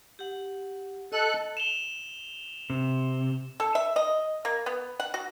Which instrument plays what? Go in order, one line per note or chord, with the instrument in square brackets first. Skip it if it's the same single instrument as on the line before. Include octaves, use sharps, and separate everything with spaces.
[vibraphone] G4 F#5
[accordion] A4 F#6 [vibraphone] D#5
[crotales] E7 F7 G7
[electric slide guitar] C3
[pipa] A4
E5
D#5
A#3
B3
F#5
F#4